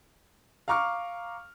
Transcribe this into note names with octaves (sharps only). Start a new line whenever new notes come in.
F5 A#5 C#6 D6 F6